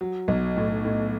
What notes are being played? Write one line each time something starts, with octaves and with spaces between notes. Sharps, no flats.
F#3
B1
A2
A2